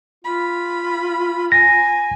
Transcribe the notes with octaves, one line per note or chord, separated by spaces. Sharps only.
F4 B5
G#5 A#6